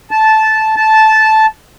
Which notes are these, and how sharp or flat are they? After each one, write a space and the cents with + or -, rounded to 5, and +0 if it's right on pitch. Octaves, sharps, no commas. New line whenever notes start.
A5 -10
A5 -10